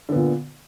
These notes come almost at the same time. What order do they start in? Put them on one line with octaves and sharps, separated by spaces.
D3 B3 A#2